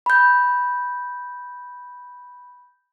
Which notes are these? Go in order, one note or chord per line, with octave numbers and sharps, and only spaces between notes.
B5 G6